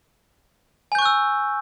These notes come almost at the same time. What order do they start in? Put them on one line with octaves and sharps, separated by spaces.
G#5 G6 C#6 F#6 E6